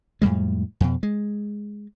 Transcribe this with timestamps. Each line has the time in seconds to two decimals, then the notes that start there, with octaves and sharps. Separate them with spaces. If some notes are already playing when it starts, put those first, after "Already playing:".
0.22 F2 A2 G3 G#3
0.81 F2 B2
1.03 G#3